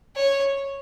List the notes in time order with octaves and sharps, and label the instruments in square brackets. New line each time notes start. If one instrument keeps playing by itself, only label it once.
[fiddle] C#5